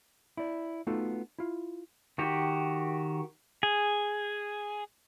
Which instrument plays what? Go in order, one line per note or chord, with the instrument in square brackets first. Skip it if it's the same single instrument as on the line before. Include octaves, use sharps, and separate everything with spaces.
[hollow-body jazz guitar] E4 D5
A3 B3 D#4 F4 F#4 A4
E4 F4
[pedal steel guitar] D#3 F#4 G4
G#4